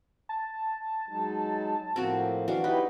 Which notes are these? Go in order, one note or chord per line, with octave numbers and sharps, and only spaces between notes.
A5
F#3 G#3 D#4
A2 F3 A#3 C4 F#4
E3 F#3 D4 F5
D#4 E4 G4 B4